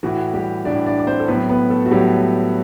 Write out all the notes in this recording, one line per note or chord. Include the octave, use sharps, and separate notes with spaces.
A2 E3 F#4
G3 G4
A2 E3 D4 D5
D4 D5
D5
C4 C5
A4
A2 F#3 B3 B4
B3 B4
A3 A4
F#4
A2 F#3 G3 G4